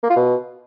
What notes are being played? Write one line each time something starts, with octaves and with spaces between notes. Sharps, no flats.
A#3
F4
B2